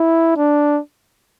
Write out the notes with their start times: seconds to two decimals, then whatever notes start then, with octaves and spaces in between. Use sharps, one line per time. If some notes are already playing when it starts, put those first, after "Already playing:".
Already playing: E4
0.37 D4